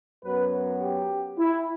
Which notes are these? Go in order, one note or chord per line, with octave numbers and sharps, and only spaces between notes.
F#2 F#3 B3 B4
G4
E4